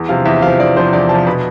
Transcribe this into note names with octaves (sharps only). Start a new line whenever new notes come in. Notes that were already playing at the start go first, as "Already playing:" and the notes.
Already playing: E2
C3 F3 F5
E2 E5
C3 F3 F5
E2 D5
C3 F3 C5
E2 D5
C3 F3 A5
B2 B5